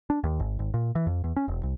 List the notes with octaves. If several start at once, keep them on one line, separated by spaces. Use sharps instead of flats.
D4
D#2
G#1
G#1
A#2
E3
F2
E2
C#4
E1
C2